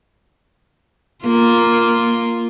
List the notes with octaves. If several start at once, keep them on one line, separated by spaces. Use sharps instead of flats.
A#3 F4